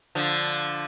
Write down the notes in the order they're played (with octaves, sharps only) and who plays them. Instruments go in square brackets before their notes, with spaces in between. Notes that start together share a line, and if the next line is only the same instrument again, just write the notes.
[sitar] D3 F3